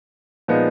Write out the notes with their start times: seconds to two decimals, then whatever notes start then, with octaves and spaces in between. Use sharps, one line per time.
0.48 A#2 F3 G#3 B3 D#4